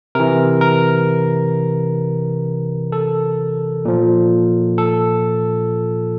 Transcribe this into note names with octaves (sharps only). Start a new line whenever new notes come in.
C3 E3 A#4
A#4
A4
A#2 F3
A4